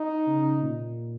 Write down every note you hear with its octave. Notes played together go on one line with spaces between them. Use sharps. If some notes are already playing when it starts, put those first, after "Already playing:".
Already playing: D#4
C#3
A#2